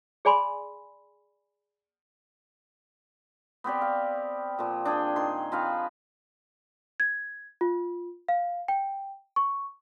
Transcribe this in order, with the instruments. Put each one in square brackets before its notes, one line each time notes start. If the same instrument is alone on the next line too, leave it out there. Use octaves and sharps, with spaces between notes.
[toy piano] G#4 D5 G#5 B5 C6
[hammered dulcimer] B3 C4 G4 D5
F5
A#2 F3
D4 G#4 G5
D#3 C6
F3 C4 B4 F5
[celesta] G#6
F4
F5
G5
C#6